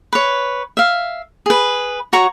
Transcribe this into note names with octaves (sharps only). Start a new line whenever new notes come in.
B4 C#5
E5 F5
G#4 B4
F#4 C#5 A#5 C#6